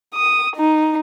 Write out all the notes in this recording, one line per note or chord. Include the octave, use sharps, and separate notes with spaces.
D#6
D#4